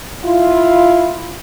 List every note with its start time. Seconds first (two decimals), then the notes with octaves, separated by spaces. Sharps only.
0.24 E4 F4